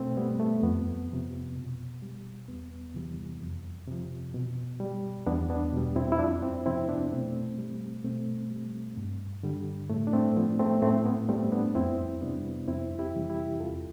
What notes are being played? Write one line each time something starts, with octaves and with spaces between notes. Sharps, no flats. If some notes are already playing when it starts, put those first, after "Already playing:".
Already playing: B2 A3 C4
G3 B3
A3
F2 B3
C3 F3
B2
G3
E2 B3
C3 E3 G3
F2
C3 F3
B2
G3
E2 B3 D4
B3 D4
B2 G3
C4 E4
E4
F2 D4 F4
C4 E4
C3 F3 C4 E4
B3 D4
B2 A3 C4
G3
B2 A3 C4
G3
G2
D3 G3
A2 A3
D4
A3 C4
F3 B3
A3 C4
A2 A3 C4
B3
G3 A3 C4
B3 D4
F2 C4 E4
C3 G3 B3 D4
F2 C4 E4
E4 G4
C3 E3 G3
E4 G4
E2 F4 A4